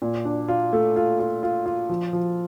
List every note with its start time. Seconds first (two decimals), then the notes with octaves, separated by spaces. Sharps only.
0.02 A#2
0.25 D4
0.48 F4
0.73 A3
0.96 F4
1.19 F4
1.43 F4
1.66 F4
1.89 F3
2.13 F3